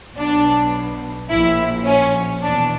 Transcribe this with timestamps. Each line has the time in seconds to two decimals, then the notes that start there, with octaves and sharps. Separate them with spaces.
0.16 B1 B2 D4
1.30 A#1 A#2 E4
1.85 C#4
2.42 E2 B2 D4